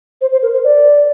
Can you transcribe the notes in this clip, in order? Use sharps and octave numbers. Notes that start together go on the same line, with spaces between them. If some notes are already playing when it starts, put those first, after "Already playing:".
C5
C5
A#4
C5
D5